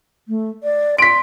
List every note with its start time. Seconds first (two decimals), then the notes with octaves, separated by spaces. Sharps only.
0.28 A3
0.63 D5
0.98 C6 B6 D7